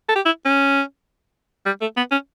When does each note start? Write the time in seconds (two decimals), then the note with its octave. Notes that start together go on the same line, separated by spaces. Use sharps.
0.09 A4
0.16 G4
0.25 E4
0.45 C#4
1.66 G3
1.81 A3
1.97 B3
2.12 C#4